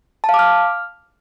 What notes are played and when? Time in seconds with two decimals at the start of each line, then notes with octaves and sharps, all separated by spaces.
0.24 A5
0.29 F5
0.34 D6
0.39 F6